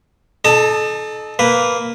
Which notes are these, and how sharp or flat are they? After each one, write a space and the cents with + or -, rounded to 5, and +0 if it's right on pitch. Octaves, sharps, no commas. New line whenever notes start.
D#4 -30 A4 -30 A5 +25
A#3 +0 B4 +0